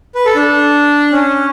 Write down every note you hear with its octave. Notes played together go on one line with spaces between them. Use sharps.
B4
A4
D4
C#4